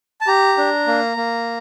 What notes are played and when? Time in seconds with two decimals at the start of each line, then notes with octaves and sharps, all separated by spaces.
0.21 A5
0.27 G4 A#5
0.58 D4
0.87 A#3
1.17 A#3